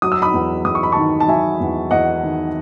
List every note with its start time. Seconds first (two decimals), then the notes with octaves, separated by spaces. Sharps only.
0.02 F#3 D#6
0.12 E6
0.22 B5 D#6
0.34 E2
0.65 E2 D#6
0.75 C#6
0.83 B5
0.92 D#3 A5 C#6
1.20 A5
1.28 F#3 E5 G#5
1.60 E2
1.91 E2 D#5 F#5
2.23 D#3